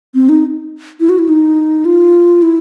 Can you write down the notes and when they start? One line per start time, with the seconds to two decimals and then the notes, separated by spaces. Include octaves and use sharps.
0.14 C4
0.29 D#4
1.00 E4
1.09 F#4
1.19 E4
1.29 D#4
1.85 F4
2.42 E4